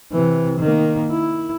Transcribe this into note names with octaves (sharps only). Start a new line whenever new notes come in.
C3 E3
D#3 A#3
E4